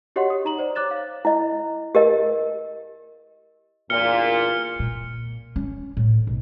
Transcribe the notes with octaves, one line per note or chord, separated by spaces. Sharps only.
F#4 G4 C#5 D#5 F#5 C6
D#6
D#4 A#5 F#7
C5 D5
C#5 D6 F#6 A6 E7
F5
E4 D#5
G4 A#4 D#5
E2 G2 A#2 F6 C#7 G7
A#2
C#4
A2
B1